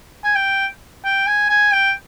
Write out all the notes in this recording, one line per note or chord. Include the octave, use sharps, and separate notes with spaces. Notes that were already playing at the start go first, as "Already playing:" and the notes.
G#5
G5
G5
G#5
G#5
G5